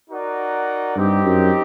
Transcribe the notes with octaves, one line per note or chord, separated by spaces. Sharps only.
D#4 F#4 A#4 D5 F#5
G2 C4 D#4 G4
F#2